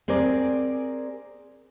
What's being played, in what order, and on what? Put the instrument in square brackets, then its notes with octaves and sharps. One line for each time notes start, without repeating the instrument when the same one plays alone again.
[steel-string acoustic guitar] C4 G#4 A#4 D5